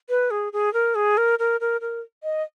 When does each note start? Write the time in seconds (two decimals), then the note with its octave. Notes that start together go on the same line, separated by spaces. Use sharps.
0.09 B4
0.31 G#4
0.53 G#4
0.74 A#4
0.95 G#4
1.17 A#4
1.39 A#4
1.60 A#4
1.81 A#4
2.23 D#5